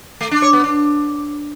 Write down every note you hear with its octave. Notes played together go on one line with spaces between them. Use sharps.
A3
D4
C#5
B3
D4